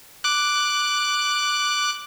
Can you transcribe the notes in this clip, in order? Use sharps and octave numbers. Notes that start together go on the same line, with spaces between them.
D6 F#6